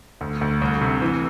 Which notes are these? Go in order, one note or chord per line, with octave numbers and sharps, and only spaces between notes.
D2
D2
C2
C3
E3